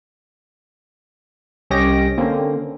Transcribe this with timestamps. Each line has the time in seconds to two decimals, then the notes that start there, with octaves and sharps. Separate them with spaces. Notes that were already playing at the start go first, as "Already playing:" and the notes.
1.70 C2 C#4 G4 D#5 A#6 D7
2.18 D3 A#3 C4 C#4